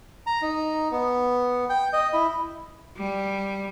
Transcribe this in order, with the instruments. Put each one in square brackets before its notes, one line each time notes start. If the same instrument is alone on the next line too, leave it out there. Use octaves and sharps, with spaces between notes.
[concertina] A#5
D#4
B3
G5
D#5
E4
[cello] G3